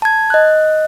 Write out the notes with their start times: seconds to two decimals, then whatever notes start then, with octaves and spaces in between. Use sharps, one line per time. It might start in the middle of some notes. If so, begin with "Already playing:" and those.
0.02 A5 G#6
0.30 D#5 F#6